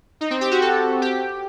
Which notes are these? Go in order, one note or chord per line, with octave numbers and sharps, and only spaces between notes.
D#4
C4
G4
F#4
A4
G4